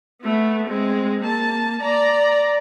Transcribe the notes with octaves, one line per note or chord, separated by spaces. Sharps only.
A3 B3
G#3 C4
A#3 A5
D5 A#5